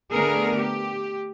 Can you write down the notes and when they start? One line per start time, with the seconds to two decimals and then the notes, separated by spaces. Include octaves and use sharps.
0.11 D3 A3 B3 D4 G#4 A#4
0.56 G4